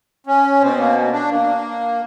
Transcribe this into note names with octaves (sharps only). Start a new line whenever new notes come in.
C#4
B2 C4
A#3
D4
A#3